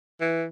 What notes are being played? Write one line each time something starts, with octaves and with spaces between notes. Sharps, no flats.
E3